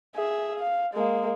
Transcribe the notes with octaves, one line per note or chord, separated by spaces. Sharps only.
G#4 E5
F5
G#3 A#3